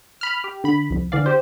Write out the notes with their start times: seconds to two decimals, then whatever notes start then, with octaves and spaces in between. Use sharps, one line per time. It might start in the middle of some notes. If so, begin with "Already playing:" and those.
0.21 B5 F6
0.44 G4
0.64 D3 B5
0.90 C2 F2
1.12 D3 E3 D5 F5
1.26 G4 C5